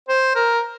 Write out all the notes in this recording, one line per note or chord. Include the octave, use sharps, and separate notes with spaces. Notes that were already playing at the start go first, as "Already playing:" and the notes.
C5
A#4